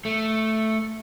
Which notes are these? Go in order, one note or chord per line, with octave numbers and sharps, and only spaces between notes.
A3